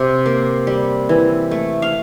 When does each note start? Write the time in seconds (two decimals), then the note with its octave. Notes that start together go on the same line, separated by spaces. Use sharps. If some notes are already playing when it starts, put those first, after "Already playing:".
Already playing: C3
0.26 A#3
0.67 G3
1.09 E3
1.51 A3
1.82 F5